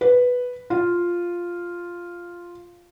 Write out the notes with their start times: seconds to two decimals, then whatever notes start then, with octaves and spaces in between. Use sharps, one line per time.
0.01 B4
0.70 F4